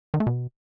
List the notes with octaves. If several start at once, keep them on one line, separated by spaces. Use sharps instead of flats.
D#3
A3
B2